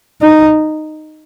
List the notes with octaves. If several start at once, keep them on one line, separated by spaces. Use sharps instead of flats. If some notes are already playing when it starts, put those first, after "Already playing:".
D#4